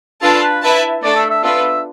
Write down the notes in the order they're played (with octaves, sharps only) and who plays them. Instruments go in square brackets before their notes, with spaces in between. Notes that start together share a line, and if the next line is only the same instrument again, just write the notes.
[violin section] D4 F4 B4 F5 A5 [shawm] A4
[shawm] B4
[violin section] E4 B4 E5 A5
[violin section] A3 D4 A4 [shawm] D5
[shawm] E5
E5
[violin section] B3 D4 F4 B4 [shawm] E5